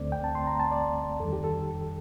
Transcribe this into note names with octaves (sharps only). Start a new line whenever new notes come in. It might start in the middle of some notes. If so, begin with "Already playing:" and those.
Already playing: D2 D3 A3 C4 D5
G5
A5
C6
A#5
A5
D5
F2 D#3 G3 A4
G4
A4